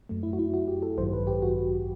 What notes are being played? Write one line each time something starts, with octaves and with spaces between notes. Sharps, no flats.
F#2 F#3 A3
E4
F#4
E4
F#4
G4
A4
A1 G2 D#3 F#3 C5
B4
G4
F#4